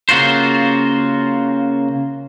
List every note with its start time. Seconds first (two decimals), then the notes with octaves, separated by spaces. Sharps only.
0.09 C#3 A#3 F4 F#4 C5